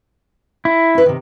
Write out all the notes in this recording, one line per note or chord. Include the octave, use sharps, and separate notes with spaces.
E4
C#4 B4
C3 D#3